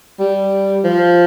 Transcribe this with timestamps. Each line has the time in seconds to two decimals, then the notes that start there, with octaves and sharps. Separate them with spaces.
0.20 G3
0.84 F3